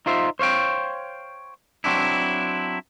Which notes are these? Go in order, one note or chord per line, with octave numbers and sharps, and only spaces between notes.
D#4 F4 C5 E5
C5 C#5 F5 G5
F#3 C4 D4 E4